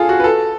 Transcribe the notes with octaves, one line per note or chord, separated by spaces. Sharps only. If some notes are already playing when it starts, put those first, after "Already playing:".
Already playing: F4 G#4 A4
F#4
B4
A4